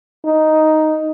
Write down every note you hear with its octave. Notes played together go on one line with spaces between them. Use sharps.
D#4